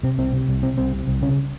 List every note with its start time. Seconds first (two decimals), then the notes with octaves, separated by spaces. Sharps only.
0.03 C3 C4
0.18 C2 C4
0.33 C3
0.48 C2
0.62 C3 C4
0.78 C2 C4
0.93 C3
1.08 C2
1.22 C#3 C#4